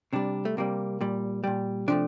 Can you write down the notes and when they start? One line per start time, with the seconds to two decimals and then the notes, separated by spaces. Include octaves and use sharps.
0.13 C3 G3 D4
0.45 A3
0.57 C3 G3 A#3
1.01 A#2 G3
1.44 A#2 G3
1.88 C3 F3 A3 D4